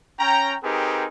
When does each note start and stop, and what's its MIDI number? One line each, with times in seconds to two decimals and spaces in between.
0.19 0.56 61
0.19 0.56 79
0.19 0.56 82
0.64 1.07 60
0.64 1.07 63
0.64 1.07 67
0.64 1.07 68
0.64 1.07 70
0.64 1.07 71